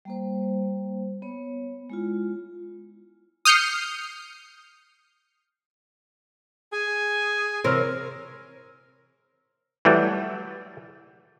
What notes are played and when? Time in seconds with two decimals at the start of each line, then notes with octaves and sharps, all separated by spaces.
0.05 G3 A#3 C5
1.22 B3 C#5
1.90 G#3 E4 F4
3.45 D#6 F6 G6 C7 C#7
6.73 G#4 G#5
7.64 C3 E3 C4 A#4 C#5 F6
9.85 E3 F#3 G3 A3